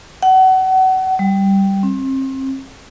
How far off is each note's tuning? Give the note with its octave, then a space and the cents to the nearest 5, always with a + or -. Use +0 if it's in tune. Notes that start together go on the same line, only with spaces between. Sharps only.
F#5 +30
G3 -5
C4 +35